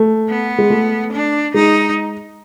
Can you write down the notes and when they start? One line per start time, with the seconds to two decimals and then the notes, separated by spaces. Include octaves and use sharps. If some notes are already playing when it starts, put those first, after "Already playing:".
Already playing: A3
0.28 B3
0.58 G#3
0.70 A3
1.12 D4
1.54 G#3 D#4